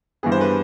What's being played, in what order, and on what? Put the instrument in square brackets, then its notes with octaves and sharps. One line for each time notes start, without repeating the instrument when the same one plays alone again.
[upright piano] G2 E3 G3 B3 [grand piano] G#4
[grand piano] C5
B4